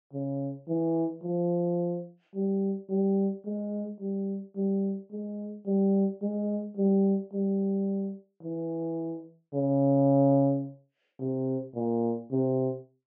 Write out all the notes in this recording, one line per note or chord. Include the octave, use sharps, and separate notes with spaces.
C#3
E3
F3
G3
G3
G#3
G3
G3
G#3
G3
G#3
G3
G3
E3
C#3
C3
A#2
C3